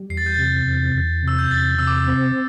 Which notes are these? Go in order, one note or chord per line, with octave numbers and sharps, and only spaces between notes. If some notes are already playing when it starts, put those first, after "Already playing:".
Already playing: G3
E2 C7
A6
G6
C3 A6
E2
E2
C3
E6
G6
E2 A6
C3 E6
D6
E6
C4